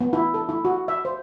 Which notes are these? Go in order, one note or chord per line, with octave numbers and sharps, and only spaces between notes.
B3
E4
A4
E4
F#4
E5
C5